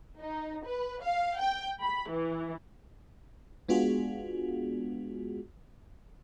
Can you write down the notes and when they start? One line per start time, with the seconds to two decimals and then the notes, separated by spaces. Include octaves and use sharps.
0.20 D#4
0.66 B4
1.02 F5
1.40 G5
1.80 B5
2.10 E3
3.68 G#3 B3 D4 F4 F#4 G#4